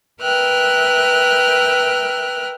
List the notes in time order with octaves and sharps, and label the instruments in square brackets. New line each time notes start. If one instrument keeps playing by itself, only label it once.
[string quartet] A#4 B4 E5 G5 F6 F#6